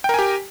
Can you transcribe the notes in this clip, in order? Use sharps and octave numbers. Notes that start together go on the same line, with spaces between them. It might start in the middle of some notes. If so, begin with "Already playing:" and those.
G4 A#4 G5 G#5